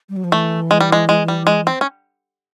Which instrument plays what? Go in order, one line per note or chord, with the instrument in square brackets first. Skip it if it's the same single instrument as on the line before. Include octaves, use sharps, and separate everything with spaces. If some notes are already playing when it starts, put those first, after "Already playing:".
[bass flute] G3
F#3
F3
[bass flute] E3 [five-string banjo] A3
[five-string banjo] G#3
G3
G#3
G#3
G3
G#3
C4
C#4